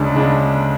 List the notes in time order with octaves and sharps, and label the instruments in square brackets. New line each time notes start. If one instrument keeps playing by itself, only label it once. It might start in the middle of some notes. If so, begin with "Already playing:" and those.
Already playing: [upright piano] D2 C#3 G#3 D4
C#3 G#3 D4